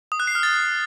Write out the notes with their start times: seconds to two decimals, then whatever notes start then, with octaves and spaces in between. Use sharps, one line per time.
0.12 D#6
0.20 F#6
0.27 C7
0.35 F6
0.43 A6